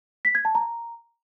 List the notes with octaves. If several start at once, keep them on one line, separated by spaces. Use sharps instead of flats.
B6
G#6
A5
A#5